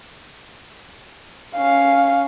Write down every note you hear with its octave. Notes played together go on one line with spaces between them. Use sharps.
C#4 F5